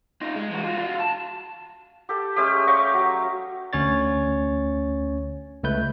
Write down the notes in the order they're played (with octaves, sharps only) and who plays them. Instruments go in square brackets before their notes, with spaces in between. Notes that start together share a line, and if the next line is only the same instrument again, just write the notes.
[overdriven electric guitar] D#4 F4
G#3
E3 F#4
F4 F#4
F#4 F5
A5
[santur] G4 A4
G#3 A3 C#4 G4
D#5 F5 G5 C#6
F#3
[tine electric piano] D2 C#4 C#5 A6
C#2 A3 B4 G6